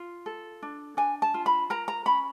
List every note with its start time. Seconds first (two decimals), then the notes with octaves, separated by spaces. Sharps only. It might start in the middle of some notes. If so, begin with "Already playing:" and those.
Already playing: F4
0.26 A4
0.62 D4
0.97 D4 G#5
1.22 A5
1.34 F4
1.46 B5
1.70 A#4 A#5
1.88 A#5
2.05 C#4 B5